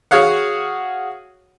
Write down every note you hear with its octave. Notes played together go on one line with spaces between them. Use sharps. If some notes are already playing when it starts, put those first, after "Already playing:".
F#4 G#4 C#5 F5 F#5